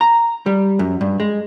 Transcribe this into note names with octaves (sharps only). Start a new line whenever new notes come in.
A#5
G3
F#2
G2
G#3